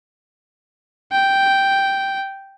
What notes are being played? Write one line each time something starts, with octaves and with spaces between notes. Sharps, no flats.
G5